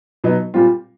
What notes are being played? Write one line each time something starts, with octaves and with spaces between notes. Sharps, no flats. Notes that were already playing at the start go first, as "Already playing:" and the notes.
B2 F#3 B3 D#4
A#2 G3 C4 F4